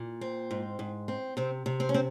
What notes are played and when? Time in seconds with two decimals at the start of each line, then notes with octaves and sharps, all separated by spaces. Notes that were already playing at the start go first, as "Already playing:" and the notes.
Already playing: A#2
0.21 C4
0.51 G#2
0.79 G#2
1.08 C4
1.37 C3 C4
1.66 C3
1.80 C4
1.89 C#4
1.94 C4